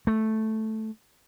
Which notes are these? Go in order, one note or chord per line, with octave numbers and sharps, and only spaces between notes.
A3